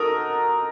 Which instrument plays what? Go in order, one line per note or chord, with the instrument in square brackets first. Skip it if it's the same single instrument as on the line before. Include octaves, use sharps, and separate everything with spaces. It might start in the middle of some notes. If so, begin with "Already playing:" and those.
Already playing: [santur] D#4 F#4 A4 D#5 [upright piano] A#4